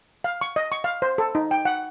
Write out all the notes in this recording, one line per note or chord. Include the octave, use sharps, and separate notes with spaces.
F5
C#6
D#5
C#6
F5
C5
A4
D#4
G5
F#5